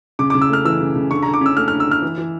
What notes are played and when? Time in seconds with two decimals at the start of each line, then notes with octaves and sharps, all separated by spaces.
0.19 C#3 D6
0.30 C#3 D6
0.41 E6
0.50 A3 F6
0.65 E3 E6
0.80 C#3
0.96 C#3
1.11 D3 C#6
1.23 D3 A#5
1.34 D6
1.41 C#4 E6
1.57 A3 F6
1.68 D3 F6
1.80 E6
1.87 D3 F6
2.02 E3
2.18 E3